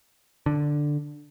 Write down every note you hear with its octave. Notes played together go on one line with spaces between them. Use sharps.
D3